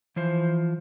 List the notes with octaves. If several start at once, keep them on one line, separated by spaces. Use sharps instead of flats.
E3 F3 C5